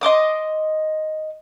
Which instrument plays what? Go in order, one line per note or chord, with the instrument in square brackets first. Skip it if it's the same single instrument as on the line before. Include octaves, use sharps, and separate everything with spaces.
[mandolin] D#5 C6 D6 D#6